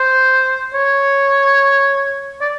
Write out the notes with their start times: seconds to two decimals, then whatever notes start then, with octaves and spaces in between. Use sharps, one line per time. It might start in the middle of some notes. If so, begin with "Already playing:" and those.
Already playing: C5
0.74 C#5
2.41 D5